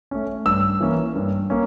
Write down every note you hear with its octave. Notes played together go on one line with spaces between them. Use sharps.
A3 C#4
G2 E6
E3 A#3 C#4
G2
A#3 C#4